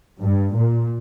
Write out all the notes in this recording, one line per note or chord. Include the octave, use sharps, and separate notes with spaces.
G2
A#2